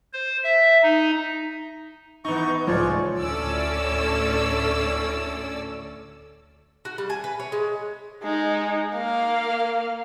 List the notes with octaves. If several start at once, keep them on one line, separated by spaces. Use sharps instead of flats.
C5
E5
D#4
E3 B3 D#4 C#6
C#2 A2 F3 G#3 C#5 D5
D2 A2 C#4 A4 D5 E6
F#4
G3
G#5
B4
C#5
G#3
G#3 D#4
A#3 F5